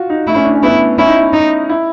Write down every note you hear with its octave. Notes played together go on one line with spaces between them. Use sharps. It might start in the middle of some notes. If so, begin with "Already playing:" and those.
Already playing: F4 F#4
D#4
A3 E4
C#4
D4
C#4
B3 E4
C#4 E4
D#4
E4
D#4
E4